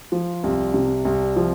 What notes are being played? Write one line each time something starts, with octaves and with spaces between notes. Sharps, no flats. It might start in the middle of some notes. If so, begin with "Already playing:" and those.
F3
C2
C3
C2
F3